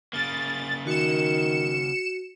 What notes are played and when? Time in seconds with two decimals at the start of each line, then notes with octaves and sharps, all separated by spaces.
0.13 C#3 A#3 A6
0.87 D#3 F#4 C#7 E7